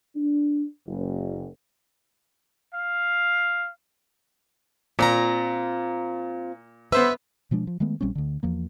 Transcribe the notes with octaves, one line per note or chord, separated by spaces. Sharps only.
D4
F#1
F5
A#2 C4 F4 A#5
B3 B4 C5 E5 E6
B2 F3 G#3 D4
F3
D#3 G#3 A3 B3
A#1 G3 C4 C#4
D2 D3
E2 F3 A#3